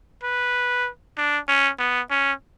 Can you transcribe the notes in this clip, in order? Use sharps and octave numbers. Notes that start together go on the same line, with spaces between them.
B4
D4
C#4
B3
C#4